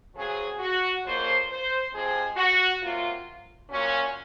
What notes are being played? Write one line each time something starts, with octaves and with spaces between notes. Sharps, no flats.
C#3 F#3 C4 G#4
F#4
F2 C#3 F3 A#3 C5
C5
C3 F3 G#3 C4 G#4
F#4
C3 F#3 A#3 F4
A#2 F#3 A#3 C#4